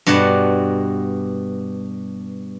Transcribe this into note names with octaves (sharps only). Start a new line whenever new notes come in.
G2 B2 D5 F#5 A5